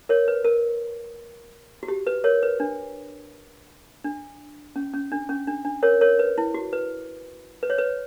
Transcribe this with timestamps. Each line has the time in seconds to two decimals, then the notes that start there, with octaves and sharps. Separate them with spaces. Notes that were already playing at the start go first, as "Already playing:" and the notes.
0.09 A#4 C#5
0.28 B4
0.45 A#4
1.83 F#4
1.88 G4
2.07 B4
2.24 A#4 C#5
2.43 B4
2.60 D4
4.04 D4
4.76 C#4
4.93 C#4
5.12 D4
5.29 C#4
5.47 D4
5.65 D4
5.83 A#4 C#5
6.01 A#4 C#5
6.19 B4
6.38 E4
6.54 F#4
6.73 B4
7.63 B4
7.70 C#5
7.78 B4